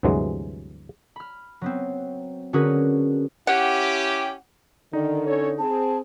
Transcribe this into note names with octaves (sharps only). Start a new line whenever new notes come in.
D2 G2 C3 E3 F#3 G#3
B5 F6
F#3 B3 C4
D3 C#4 F#4 G#4 A#4 B4
C#4 E4 G4 F#5
D3 D#3 D#4 D5
C#4 A4 C#5
C4 G#4 A5